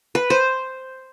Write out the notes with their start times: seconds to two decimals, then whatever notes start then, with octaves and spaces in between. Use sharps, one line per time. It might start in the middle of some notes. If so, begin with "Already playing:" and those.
0.15 B4
0.30 C5